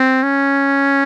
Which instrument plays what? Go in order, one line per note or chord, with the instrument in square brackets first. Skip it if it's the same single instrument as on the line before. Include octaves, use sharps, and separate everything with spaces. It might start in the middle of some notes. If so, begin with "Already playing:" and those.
Already playing: [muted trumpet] C4
C#4